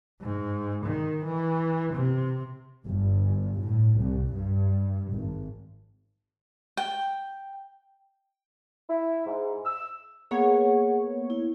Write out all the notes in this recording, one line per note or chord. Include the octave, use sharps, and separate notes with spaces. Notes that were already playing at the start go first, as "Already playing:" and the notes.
G#2
D#3
E3
C3
G1
A2
C2
G2
G#1
G5
E4
G#2
E6
A#3 B3 G#4 C#5 F#5
E4